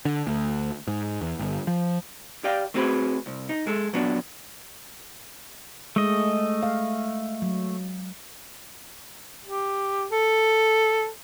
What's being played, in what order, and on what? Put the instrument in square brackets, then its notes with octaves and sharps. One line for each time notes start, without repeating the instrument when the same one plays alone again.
[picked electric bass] D3
D2
G#2
E2
G1
F3
[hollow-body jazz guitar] G4 D5 F5 G5
A3 C4 C#4 F#4 G#4 B4
C2
D#4
G#3 A4
A#2 F#3 B3 D4
[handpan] G#3 [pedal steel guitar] A3 D#5
[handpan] F5
F#3
[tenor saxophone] G4
A4